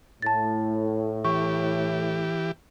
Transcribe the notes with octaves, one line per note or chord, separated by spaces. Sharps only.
A2 A5 A6
E3 G4 C#6